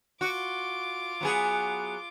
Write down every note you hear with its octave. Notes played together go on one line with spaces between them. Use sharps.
F4 F#4 D6
F#3 B3 G#4